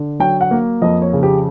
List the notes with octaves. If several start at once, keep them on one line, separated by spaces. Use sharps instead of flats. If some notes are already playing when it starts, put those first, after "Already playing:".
Already playing: D3
F#3 G5
F#5
A#3
F2 D#5
C#5
C#3
G4